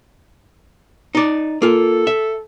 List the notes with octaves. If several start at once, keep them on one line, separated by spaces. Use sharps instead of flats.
D#4 D5
A#3 F4 A4
E5